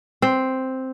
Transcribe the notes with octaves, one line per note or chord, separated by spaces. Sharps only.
C4